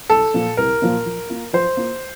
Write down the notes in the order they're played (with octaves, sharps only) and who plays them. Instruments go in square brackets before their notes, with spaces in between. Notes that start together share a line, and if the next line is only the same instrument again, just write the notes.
[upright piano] C2 [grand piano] A4
[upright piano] A#2 F3 A#3
[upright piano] C2 [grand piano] A#4
[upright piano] A#2 F3 A#3
F3
A#3 F4
[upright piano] F3 [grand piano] C5
[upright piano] A#3 F4